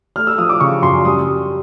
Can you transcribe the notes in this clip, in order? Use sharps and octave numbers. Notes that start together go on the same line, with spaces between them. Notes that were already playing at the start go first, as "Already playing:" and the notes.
A3 F6
E6
F3 D#6
D6
C#3 C#6
F#2 C6
G3 D#6